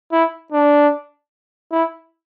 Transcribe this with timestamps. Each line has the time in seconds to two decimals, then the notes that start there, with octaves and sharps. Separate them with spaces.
0.12 E4
0.52 D4
1.72 E4